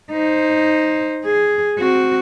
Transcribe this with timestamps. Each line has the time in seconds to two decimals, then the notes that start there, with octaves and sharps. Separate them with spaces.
0.11 D#4 C5
1.25 G#4
1.79 C4 F#4